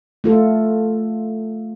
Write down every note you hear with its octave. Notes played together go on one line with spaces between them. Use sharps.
A3 F4 A4